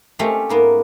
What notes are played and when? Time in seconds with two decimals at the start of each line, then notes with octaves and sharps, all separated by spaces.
0.19 A3 C4 C#4 G4 D#5 F5
0.49 G#2 A#3 B3